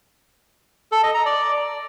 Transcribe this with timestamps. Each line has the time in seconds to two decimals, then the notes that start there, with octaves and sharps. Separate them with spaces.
0.92 A4
1.03 D#5
1.14 A#5
1.26 D5